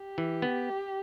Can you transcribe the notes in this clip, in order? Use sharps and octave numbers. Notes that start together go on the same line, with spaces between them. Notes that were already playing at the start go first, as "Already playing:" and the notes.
Already playing: G4
E3
B3